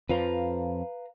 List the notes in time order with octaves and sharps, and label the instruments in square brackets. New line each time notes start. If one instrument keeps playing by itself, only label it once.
[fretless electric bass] F2 F3 [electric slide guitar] B4 F5 A#5